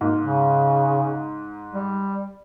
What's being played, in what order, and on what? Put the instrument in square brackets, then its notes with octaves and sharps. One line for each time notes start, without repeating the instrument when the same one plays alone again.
[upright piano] G#2 [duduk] A#3
[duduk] C#3
G3